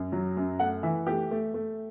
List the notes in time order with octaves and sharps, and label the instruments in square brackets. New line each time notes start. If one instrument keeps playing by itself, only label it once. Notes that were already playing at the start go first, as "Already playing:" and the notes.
Already playing: [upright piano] F#2
F#3
F#2
A3 F#5
E3 E5
A3 G4
A3
A3